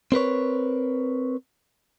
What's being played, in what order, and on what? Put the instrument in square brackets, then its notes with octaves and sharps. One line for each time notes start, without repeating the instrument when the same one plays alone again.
[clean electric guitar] C4 A#4 B4 C#5